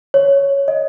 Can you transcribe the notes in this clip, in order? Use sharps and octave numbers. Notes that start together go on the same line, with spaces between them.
C#5
D#5